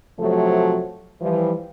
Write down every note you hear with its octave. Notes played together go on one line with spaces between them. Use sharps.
C3 F3 F#3 A3 A4
E3 F3 G3